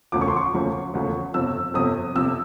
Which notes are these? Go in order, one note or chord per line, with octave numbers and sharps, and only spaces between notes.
E1 D2 C#3 F3 D6
C#6
C6
C#6
E1 D2 C#3 F3
E1 D2 C#3 F3
G1 F2 C3 E6
G1 F2 C3 D#6
G1 F2 C3 E6